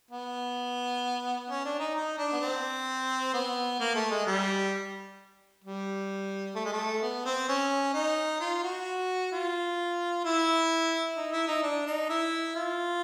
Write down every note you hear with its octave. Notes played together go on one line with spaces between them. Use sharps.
B3
C#4
D4
D#4
D#4
D4
B3
C4
B3
A#3
A3
G#3
G3
G3
A3
G#3
A3
B3
C4
C#4
D#4
F4
F#4
F4
E4
D#4
E4
D#4
D4
D#4
E4
F4